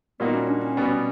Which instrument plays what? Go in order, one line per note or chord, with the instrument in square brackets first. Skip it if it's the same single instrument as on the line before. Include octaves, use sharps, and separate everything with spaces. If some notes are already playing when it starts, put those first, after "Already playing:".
[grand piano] A#2 G3 A#3 D#4 F#4 [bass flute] B3
[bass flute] C#4
D4
C#4
[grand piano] B2 G3 B3 [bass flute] C#4
[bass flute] C#4